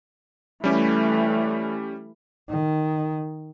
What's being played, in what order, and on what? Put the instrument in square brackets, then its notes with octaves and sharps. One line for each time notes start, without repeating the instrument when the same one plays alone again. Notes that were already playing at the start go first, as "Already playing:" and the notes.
[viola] E3 A3 [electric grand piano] G3 C#4 G4
[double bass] D#3